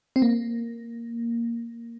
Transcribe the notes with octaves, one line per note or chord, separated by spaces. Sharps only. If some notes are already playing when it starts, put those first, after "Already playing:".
C4
A#3